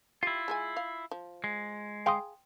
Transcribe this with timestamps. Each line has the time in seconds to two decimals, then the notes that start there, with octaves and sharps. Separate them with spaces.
0.23 E4 F4 G4
0.48 G#3 A4 G#5
0.77 F5
1.11 F3
1.44 G#3
2.06 G#4 F5 G5 C6 D#6